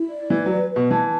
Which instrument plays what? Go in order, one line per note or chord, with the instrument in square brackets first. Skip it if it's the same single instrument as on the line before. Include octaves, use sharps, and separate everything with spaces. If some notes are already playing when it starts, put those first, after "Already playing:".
Already playing: [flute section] E4
D5
[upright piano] E3 [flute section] B4
[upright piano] F#3 [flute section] B4
[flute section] B4
[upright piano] B2
[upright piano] E3 [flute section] A5